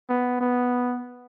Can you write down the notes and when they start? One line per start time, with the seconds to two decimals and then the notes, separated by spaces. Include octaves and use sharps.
0.09 B3
0.41 B3